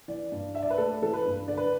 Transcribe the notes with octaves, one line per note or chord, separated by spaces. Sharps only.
E3 D5
G2
D4 E5
D5
B4
A3 A4
E3 A4
B4
G2
D3 D5
B4